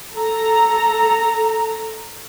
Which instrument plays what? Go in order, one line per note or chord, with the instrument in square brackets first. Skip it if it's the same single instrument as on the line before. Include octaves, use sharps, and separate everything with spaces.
[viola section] A4 A#5